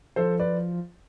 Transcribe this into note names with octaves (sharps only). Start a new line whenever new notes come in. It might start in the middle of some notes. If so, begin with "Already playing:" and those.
F3 A4 C5
B4 D5